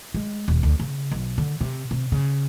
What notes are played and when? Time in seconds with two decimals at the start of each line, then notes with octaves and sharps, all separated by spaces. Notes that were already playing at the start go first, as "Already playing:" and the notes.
0.14 G#3
0.48 D#1
0.63 D2
0.80 C#3
1.11 B1
1.38 D3
1.61 C3
1.91 C3
2.12 C#3